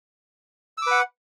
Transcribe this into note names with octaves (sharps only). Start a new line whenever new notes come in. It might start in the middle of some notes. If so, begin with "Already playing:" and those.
B4 F#5 D6 E6